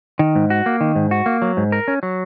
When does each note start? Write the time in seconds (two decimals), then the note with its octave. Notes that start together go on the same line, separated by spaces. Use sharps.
0.19 D#3
0.36 G#2
0.50 F#4
0.66 A#3
0.81 D#3
0.96 G#2
1.11 F#4
1.26 A#3
1.42 F#3
1.57 G#2
1.72 A#4
1.88 C#4
2.03 F#3